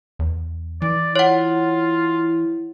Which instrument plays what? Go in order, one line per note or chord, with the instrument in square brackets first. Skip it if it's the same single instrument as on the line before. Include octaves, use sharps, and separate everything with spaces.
[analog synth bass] E2
[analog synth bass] E3 [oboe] D5
[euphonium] E4 [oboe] F4 [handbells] C#5 F#5